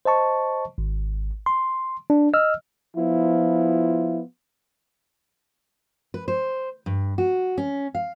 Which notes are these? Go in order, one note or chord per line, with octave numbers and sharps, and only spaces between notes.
C5 D#5 A5 C#6
G#1
C6
D4
D#5 E6 F6
F3 B3 E4 F4
B4
C5
G2
F#4
C#4
F5